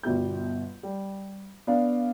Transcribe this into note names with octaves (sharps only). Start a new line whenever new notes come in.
G1 B2 G3 G6
G3
B3 D4 D5 F5